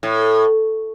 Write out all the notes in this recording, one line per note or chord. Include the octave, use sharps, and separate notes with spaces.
A2